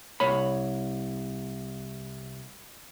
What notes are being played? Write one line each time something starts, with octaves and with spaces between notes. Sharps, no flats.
C2 C#5 B5